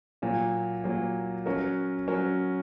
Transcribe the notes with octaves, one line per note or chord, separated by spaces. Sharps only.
A#2 F#3 A#3
A#2 F#3 A#3
F#3 C#4 F#4 A#4
F#3 C#4 F#4 A#4